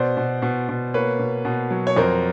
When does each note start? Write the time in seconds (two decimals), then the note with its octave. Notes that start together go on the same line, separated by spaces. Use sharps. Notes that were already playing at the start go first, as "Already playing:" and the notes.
Already playing: B2 C5 D5
0.17 B2
0.42 B2
0.69 B2
0.94 A#3 B4 C#5
1.19 B2
1.45 B2
1.71 F#3
1.87 C#5
1.96 F2 A#4 C5